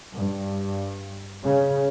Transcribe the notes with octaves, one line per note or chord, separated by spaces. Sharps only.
G2
C#3